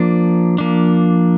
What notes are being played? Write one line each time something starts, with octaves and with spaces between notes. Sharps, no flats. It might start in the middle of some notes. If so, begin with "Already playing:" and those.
Already playing: F3 A#3 D4
F3 A#3 D4